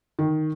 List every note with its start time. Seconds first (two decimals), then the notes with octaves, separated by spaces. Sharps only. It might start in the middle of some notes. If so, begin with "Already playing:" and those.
0.19 D#3